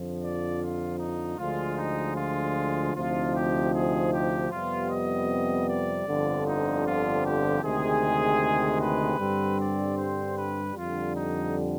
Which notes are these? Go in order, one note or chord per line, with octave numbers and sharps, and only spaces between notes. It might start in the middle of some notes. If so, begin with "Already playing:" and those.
Already playing: F2 D3 F3
D5
F4
D#4
D2 D3 F3 G#3 F4
D#4
F4
D2 C3 F3 C4 D#4 F4
G4
G#4
G4
F2 C3 G3 B3 F4
D#5
D5
G1 F2 D3 F3
D#4
F4
G4
D2 C3 D#3 G#3 G#4
B4
G2 D3 G3 C4
D5
C5
B4
F2 D3 G3 F4
D#4